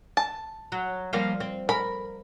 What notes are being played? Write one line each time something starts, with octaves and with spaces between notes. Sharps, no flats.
A5
F#3
F3 G3 A#3
C4
A#4 B5